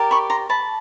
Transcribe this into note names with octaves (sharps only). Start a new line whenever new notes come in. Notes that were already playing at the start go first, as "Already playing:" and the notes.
Already playing: G4 A#4 D5
B5 C#6
A#5 C6
A5 B5